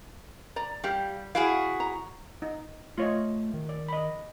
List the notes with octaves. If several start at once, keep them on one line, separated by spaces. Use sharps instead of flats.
D5 A#5
G3 G4 F5 G5
E4 F#4 G#4 F5
A#5
D#4
A3 F4 C#5 D#5
D#3
D5
D#5 B5